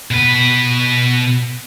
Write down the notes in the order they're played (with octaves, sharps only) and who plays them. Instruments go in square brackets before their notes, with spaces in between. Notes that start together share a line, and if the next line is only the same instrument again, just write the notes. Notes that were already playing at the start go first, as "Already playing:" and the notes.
[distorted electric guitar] B2 B4